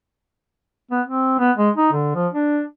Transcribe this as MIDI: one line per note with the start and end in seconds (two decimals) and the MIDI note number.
0.91 1.01 59
1.07 1.34 60
1.38 1.52 59
1.57 1.70 56
1.76 1.89 63
1.92 2.12 50
2.15 2.28 53
2.33 2.62 62